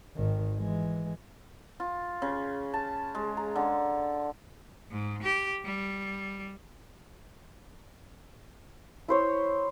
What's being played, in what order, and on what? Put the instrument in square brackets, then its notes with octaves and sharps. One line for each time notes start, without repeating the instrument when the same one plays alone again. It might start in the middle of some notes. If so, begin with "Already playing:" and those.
[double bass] G#1 D#3
E3 G#3
[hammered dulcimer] F4
C#3
A5
G#3
A#5
D3
[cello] G#2
G4
G3
[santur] E4 C5 C#5